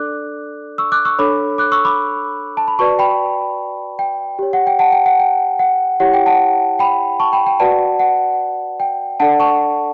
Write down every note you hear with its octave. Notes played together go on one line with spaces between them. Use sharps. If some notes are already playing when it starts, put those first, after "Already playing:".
Already playing: D4 A4 D5 D6 F#6
C#6 E6
D6 F#6
C#6 E6
D4 A4 C#5 B5 D6
D6 F#6
C#6 E6
B5 D6
A5
B5
F#4 B4 D5 A5 C#6
G5 B5
G5
G4 C#5
F#5
G5
F#5 A5
G5
F#5
G5
F#5
E4 G4 C#5 F#5
G5
F#5 A5
G5 B5
A5 C#6
G5 B5
G5
F#4 B4 D5 F#5 A5
F#5
G5
D4 A4 D5 F#5 A5
A5 C#6